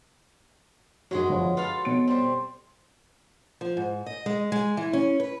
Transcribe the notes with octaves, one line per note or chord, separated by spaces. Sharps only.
F#2 F#3 G#3 F#4 G#4
G1 F3 C#5
F4 A4 B4 F5
B2 C#5 D7
G3 C4
F3
G#2
D#5
G#3
G#3
E3
C#4
B4